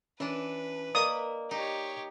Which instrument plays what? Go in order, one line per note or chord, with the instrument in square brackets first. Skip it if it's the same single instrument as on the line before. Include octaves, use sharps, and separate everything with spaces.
[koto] E3 D4 [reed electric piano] C#4 [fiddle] B4
[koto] A#3 [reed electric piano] D5 D#5 [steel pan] D#6
[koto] D#4 [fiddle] G4 C#5